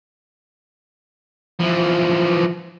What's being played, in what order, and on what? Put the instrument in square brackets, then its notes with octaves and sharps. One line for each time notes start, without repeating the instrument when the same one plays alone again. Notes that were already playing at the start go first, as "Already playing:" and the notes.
[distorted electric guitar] E3 F3